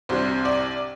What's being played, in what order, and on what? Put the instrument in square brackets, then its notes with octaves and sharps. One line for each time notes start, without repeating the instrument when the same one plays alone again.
[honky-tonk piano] C2 C3 G3 D4 C5
D5